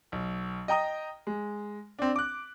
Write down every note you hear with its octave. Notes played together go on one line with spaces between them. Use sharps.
B1
D#5 G5 A#5 D#6
G#3
C4 D4
D6 F#6